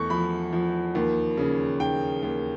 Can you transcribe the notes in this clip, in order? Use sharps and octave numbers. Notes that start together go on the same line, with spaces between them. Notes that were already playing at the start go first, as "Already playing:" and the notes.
Already playing: E2 A3 C#6
F3 B5
F3
D#2
C#3
D#2 G5
D#2